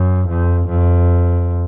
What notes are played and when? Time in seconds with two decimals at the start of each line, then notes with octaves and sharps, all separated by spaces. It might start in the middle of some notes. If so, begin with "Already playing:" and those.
Already playing: F#2
0.28 F2
0.69 F2